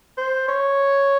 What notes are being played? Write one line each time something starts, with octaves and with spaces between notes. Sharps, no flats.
C5
C#5